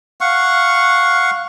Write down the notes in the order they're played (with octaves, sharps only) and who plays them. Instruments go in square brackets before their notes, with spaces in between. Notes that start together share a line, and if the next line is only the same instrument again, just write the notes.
[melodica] F5 F#5 C#6